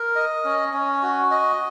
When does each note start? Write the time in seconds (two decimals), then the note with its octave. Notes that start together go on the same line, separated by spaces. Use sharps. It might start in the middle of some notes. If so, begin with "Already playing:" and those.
Already playing: A#4
0.15 D#5
0.45 C#4
0.73 C#4
1.02 F#4
1.31 D#5